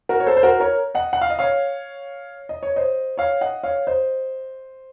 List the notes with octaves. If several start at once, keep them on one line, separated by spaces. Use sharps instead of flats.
F#4 A#4
C#5
A4 C5
C5
F#4 A#4
A#4 C#5
D#5 F#5
F#5
F5
D#5
C#5 F5
D#5
C#5
C5 D#5
C#5 F5
D#5 F#5
C#5 F5
C5 D#5